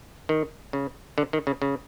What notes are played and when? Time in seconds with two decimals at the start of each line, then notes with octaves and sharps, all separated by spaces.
0.29 D#3
0.73 C#3
1.18 D3
1.33 D#3
1.47 C#3
1.62 C#3